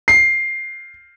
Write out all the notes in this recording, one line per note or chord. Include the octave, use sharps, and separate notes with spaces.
C7